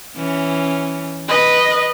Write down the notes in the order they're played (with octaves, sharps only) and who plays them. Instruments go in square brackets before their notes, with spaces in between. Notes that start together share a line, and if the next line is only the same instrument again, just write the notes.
[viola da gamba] E3 C#4
[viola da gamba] B4 [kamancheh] D#5